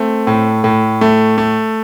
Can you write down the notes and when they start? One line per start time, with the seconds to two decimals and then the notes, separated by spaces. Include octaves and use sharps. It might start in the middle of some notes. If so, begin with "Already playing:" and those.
Already playing: A3 C4
0.27 A2
0.64 A2
1.01 A3
1.38 A3